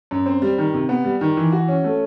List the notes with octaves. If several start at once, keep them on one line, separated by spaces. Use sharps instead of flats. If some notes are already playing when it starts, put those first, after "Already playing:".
F#2
C4
G3
D#3
C3
B3
G3
D#3
E3
F#4
C#4
A3